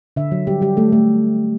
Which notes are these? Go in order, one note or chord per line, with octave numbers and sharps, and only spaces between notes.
D3 E5
F#3
G3 G4
G3 G4
A3 A4
A3